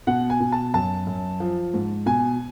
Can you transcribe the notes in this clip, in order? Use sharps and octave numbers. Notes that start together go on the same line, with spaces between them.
B2 F#5
G#5
B2
A5
F#2 A5
F#2
F3
G#2
B2 G#5